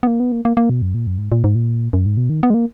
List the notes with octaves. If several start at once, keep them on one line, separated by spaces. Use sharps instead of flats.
B3
A#3
B3
A#3
A#3
A#3
B2
F#2
A#2
F#2
G#2
A#2
G#2
A#2
F#2
G#2
B2
D#3
B3
G#3
A#3